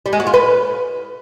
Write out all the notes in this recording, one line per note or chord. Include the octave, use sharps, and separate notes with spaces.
G3
G#3
F#4
F4
B4